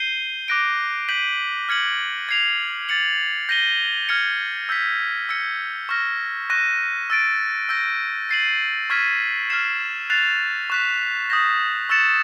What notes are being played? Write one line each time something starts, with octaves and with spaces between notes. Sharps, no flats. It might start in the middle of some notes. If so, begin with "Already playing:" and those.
Already playing: G6 C7 D#7 G7
D6 F#6 A#6 D7
G6 B6 D#7 F#7
F6 G#6 C#7 F#7
G#6 C7 F7
A6 C#7 F#7
G6 A#6 D#7 G7
F6 G#6 C#7
E6 G6 B6
E6 G#6 C#7
C#6 F6 A#6
C#6 F#6 A#6 D#7
E6 A6 D7
E6 G6 A#6
A6 C7 D#7 F#7
C#6 F6 G#6 B6 D#7
F6 G#6 C7 E7
F#6 A6 C7 F7
C#6 F#6 B6
D#6 G6 A#6
C#6 E6 A6 C#7 E7